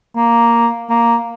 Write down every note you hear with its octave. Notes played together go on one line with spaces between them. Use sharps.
A#3
A#3